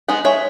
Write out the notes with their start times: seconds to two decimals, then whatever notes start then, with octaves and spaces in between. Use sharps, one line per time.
0.08 G#3 B3 D#4
0.25 G#3 C#5 E5